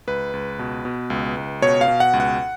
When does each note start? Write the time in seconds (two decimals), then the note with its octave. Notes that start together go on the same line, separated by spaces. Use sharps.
0.07 C#2 B4
0.33 C#2
0.59 B2
0.85 B2
1.10 C#2
1.37 C#2
1.62 B2 C#5
1.81 F5
1.88 B2
2.00 F#5
2.13 C#2
2.20 F#5